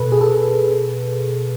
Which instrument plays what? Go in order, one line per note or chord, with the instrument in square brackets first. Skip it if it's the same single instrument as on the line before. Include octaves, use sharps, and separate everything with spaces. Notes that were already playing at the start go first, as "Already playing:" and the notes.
Already playing: [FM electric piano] B2 A4 B4
G#4
A4